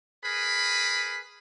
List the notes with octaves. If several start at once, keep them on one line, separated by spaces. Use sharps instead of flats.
G#4 A#4 B4 B5